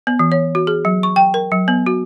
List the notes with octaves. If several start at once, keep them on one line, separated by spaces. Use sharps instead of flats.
B3
E3
C#5
F#4
G#4
F#3
C#6
G5
A#4
F#3
B3
F#4